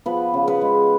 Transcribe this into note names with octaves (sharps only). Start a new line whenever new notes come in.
F3 B3 B4
C#3
B3 B4
G#3